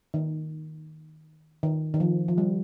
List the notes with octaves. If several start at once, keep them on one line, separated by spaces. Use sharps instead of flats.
D#3
D#3
D#3
F3
F3
G3